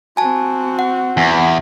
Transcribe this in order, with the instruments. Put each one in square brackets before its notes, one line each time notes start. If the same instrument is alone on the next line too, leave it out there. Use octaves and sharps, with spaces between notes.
[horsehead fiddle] C4 F#4 [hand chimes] G#5 A5
[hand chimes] F#5
[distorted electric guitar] E2